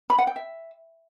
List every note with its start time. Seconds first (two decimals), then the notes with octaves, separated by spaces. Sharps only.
0.10 B5
0.18 F#5
0.27 G5
0.36 E5